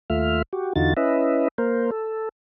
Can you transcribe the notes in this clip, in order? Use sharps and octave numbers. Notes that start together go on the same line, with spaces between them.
D#2 A3 F4 E5 F6
F#4 G4
E2 D3 D#4 F4 F#4 A6
C#4 E4 B4 D#5 E5
A#3 A#4 C5
A4